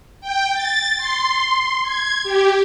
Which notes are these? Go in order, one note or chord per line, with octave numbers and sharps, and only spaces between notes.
G5
A6
C6
G#6
G4